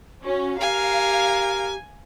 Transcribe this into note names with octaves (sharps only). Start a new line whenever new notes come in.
C#4 F#4
G4 A#4 F5 G#5